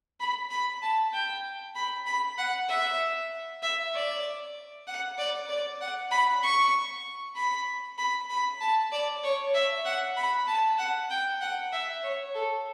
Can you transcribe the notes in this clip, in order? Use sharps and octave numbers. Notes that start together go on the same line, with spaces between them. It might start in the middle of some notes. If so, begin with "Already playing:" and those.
B5
B5
A5
G5
B5
B5
F#5
E5
E5
D5
F#5
D5
D5
F#5
B5
C#6
B5
B5
B5
A5
D5
C#5
E5
F#5
B5
A5
F#5
G5
F#5
E5
C#5
A4